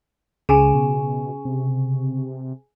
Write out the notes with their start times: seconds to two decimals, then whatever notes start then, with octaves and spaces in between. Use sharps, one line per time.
0.49 C#2 C#3 G#4 G#5
0.75 B2
1.45 C3